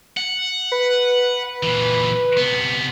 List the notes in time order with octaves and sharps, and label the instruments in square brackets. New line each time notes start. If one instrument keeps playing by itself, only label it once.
[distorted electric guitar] F#5
[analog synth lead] B4
[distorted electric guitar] A#2 E3
C3 B3